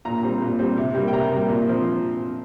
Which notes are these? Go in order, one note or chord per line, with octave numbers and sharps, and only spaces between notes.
A#2 A#5
G3 C4
A#2
G3 C4
C3
G3 A#3
G5
C3 A#5
G3 A#3
A#2
F3 C4